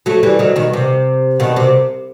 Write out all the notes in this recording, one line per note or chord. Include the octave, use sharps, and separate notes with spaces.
F#3 A3
E3 G3
D#3 F#3
B2 D#3
C3
B2 D#3
C3